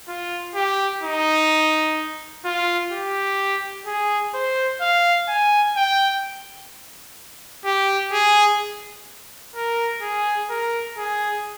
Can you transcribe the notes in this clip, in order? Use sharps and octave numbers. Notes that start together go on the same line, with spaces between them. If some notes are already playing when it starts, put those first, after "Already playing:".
F4
G4
D#4
F4
G4
G#4
C5
F5
G#5
G5
G4
G#4
A#4
G#4
A#4
G#4